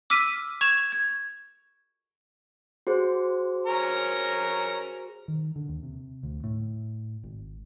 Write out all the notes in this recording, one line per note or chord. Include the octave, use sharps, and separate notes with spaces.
D6 E6 F6 B6 D#7
C#6 G#6 E7 F7
G#6
F#4 G#4 C5
C#4 A#4 A#5
D#3
D3
D#2
C3
D2
A2
G#1